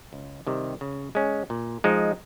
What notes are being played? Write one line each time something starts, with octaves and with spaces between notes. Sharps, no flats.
C#2
C3 D#3 G3
C#3
G#3 C#4
A#2
F3 G#3 D#4